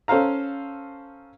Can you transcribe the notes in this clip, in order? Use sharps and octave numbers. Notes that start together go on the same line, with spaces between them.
C#4 A4 C5 F5 A#5